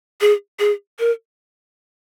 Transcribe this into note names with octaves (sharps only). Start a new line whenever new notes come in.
G#4
G#4
A#4